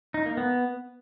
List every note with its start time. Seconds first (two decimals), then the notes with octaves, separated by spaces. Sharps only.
0.14 D#4
0.26 A#3
0.37 B3